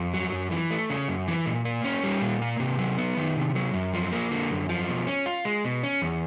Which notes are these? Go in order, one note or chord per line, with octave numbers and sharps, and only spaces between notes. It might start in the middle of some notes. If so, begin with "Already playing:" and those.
Already playing: F2
F#3
F#2
E3
A3
C#3
F#2
E3
A#2
A#3
C#4
G3
A#2
A#3
C3
F#3
B3
D#3
C3
F#3
F#2
F3
A#3
D3
F#2
F3
B2
C#4
F4
G#3
B2
C#4
E2